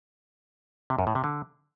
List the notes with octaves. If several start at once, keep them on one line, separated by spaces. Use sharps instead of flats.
C3
F#2
A2
C3
D3